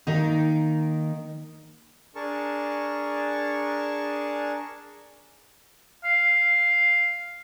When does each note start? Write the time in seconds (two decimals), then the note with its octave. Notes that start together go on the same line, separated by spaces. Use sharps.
0.07 D#3 A#3 D#4
2.15 D4 G#4 A#4 A5 C#6
6.04 F5